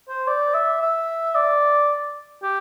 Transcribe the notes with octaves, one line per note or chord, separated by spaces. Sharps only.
C5
D5
E5
E5
D5
G4